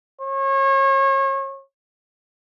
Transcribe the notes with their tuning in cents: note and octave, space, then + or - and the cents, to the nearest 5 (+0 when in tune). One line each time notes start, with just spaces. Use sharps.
C#5 -35